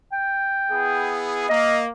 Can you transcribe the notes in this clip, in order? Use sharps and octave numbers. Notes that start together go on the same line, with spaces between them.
G5
B3 E4 G#4
A#3 D#5